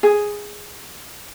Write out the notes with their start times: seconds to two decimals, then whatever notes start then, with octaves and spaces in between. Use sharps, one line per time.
0.03 G#4